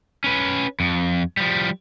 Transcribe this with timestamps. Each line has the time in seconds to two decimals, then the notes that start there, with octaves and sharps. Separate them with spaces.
0.24 C#4 B4
0.80 F2
1.37 F3 G3